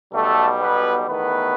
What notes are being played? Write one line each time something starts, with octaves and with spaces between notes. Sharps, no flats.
B1 B2 G3 A3 A4
B3 B4
E2 D#3 A3 B3 B4